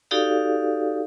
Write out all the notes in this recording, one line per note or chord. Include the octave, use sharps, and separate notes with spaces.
D#4 F#4 G4 A4 D5 F5